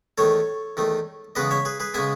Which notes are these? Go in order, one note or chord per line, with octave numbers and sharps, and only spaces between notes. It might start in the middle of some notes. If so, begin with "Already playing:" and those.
E2 D#3 A3 A4 C#5
E2 D#3 A3
E2 C#3 G#3 B3 B4 D#5
C#5 E5
G#4 B4
G#4 B4
C#3 G#3 B3 E5 G#5